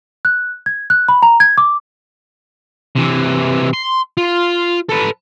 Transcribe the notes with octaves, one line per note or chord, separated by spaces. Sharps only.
F#6
G#6
F#6
B5
A#5
G#6
D6
C3 E3
C6
F4
A4 B4